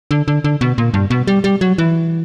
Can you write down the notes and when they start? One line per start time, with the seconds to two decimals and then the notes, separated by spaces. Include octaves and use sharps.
0.11 D3
0.28 D3
0.44 D3
0.61 B2
0.78 A#2
0.94 G2
1.10 B2
1.27 G3
1.44 G3
1.61 F#3
1.78 E3